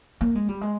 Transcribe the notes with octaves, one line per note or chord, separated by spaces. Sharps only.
A#3
G#3
G3
G#3